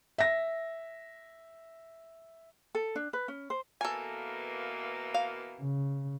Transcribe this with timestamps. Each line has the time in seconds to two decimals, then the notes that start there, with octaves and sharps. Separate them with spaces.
0.18 E5 A#6
2.75 A4
2.95 D4
3.13 B4
3.28 C#4
3.50 C5
3.81 B2 E3 A#3 A4 G#5
5.14 F5
5.61 C#3